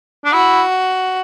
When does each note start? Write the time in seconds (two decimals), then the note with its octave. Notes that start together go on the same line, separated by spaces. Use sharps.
0.25 D4
0.32 E4 F#4